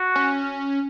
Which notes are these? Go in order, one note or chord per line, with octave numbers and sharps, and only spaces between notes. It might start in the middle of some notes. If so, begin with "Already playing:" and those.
Already playing: F#4
C#4